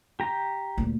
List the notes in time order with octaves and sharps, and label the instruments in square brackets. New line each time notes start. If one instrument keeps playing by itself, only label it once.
[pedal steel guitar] G4 A#5
[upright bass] D2 A#2